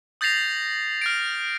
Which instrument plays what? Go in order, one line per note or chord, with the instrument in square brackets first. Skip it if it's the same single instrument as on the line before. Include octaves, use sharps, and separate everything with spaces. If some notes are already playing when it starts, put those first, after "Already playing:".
[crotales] D#6 G6 A6 A#6 C7 F7
F6 A6 D7